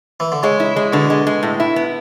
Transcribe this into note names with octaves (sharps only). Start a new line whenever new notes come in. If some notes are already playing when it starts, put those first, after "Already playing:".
E3
D3
C#3 G#3
E4
G#3
B2 D3
G#3
G#3
A2
E4
B3